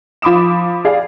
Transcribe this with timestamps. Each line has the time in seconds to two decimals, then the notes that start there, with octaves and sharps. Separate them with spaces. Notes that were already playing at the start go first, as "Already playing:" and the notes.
0.22 F3 B5 D6 D#6 E7
0.85 G4 G#4 D5 F5